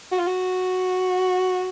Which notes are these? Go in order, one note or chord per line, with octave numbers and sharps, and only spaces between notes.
F#4
F4
F#4